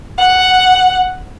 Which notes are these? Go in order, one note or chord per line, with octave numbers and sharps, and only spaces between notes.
F#5